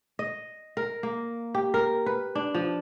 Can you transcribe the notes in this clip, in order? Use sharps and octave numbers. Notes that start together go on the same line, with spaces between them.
D#5
A#4
A#3
G4
A#4
B4
D4
F3